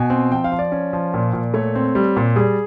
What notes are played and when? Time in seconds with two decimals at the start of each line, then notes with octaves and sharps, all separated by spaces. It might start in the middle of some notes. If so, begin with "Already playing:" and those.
Already playing: B2 G#5
0.10 C4
0.31 F3 G5
0.44 F5
0.52 F3
0.59 D5
0.72 C#4
0.93 F3
1.14 A#2
1.33 A#2
1.54 A3 C#5
1.75 C4
1.95 G3
2.16 A#2
2.36 G3 G#4